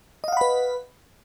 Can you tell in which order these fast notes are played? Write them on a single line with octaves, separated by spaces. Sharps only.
D#5 F5 F#5 B5 B4